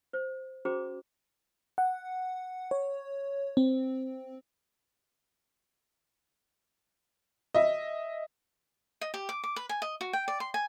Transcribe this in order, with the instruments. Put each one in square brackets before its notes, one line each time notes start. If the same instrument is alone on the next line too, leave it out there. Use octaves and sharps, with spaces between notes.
[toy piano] C5
C#4 F#4 G#4 C5 A#5 D6
[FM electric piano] F#5
C#5
C4
[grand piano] D#5 E5
[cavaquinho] D#5
G4
D6
D6
B4
G#5
D#5
F#4
G5
D5
C6
G#5